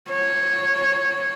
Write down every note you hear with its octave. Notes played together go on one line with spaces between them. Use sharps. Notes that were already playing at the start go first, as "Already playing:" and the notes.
C#5